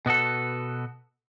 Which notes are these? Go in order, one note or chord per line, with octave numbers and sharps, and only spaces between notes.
B2 B3 F#4 A4